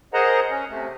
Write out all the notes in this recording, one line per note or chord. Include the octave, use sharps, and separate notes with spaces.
G#4 A#4 C5 D#5 F#5 A#5
C#4
C3 A3